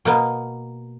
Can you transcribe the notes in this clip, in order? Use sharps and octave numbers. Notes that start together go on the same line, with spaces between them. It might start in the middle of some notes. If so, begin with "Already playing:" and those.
B2 A#3 B3